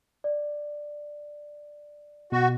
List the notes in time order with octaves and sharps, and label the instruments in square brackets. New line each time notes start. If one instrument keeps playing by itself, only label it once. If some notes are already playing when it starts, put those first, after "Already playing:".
[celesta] D5
[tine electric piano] B2 [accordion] F#4